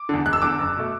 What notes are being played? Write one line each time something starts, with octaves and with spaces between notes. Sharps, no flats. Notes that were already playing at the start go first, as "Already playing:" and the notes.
Already playing: D6
E2 D3
E1 F#6
E6
E2 D3 D6
F#1
B2 A3